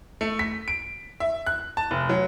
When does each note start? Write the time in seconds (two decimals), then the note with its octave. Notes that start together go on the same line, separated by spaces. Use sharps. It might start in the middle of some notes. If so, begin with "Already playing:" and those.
0.21 A3
0.39 B6
0.68 D7
1.20 E5
1.46 F#6
1.77 A5
1.91 F1
2.09 F#3